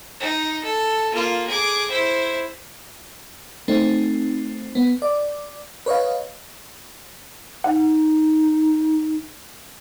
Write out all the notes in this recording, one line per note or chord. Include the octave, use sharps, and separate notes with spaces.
D#4
A4
A#3 F4
G#4 D6
E4 C5
A3 C4 D#4
B3
D5
B4 C#5 D#5 F5
D#4 F#5